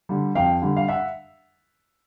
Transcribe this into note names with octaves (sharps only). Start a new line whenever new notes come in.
D3 G3
F2 F5 G5
D3 G3
F5
E5 F#5